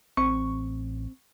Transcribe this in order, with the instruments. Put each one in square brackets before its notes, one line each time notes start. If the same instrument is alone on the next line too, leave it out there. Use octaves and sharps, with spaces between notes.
[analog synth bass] A1 [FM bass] C4 [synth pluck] C#6